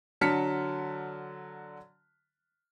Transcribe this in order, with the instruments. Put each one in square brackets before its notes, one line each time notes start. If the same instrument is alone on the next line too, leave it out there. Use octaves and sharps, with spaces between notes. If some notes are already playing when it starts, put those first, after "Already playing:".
[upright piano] D3 F#3 A5 F6 B6 C#7